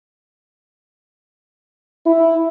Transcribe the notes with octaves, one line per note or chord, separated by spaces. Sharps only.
E4